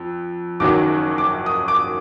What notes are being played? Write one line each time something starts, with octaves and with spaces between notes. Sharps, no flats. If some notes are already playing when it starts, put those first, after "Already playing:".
Already playing: F2
F#1 F#2 D#3 F#3 D6
D6
D#6
D6